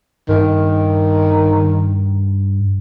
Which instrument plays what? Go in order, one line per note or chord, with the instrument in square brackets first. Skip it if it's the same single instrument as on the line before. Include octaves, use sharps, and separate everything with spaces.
[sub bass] G2 [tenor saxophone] D#3